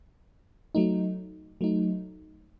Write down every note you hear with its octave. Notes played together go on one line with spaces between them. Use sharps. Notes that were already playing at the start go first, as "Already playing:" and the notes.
F#3 A3 D#4
F#3 A3 D#4